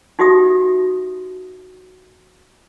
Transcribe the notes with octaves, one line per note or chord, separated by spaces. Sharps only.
D#4 F#4 G4 E5 D#6